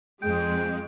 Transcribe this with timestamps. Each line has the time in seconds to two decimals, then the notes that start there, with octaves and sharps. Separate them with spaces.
0.22 F2 G#3 G5